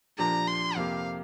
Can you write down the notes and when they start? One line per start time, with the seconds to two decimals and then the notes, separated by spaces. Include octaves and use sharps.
0.18 A#2 F3 D4 G4 A#5
0.48 C6
0.76 F2 C3 A#3 G4 F5